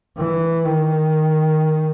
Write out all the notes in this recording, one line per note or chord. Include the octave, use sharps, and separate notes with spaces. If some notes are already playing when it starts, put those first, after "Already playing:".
E3
D#3